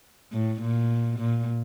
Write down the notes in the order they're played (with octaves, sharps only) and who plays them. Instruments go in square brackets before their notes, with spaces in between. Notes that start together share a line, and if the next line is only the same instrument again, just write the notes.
[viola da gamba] A2
A#2
A#2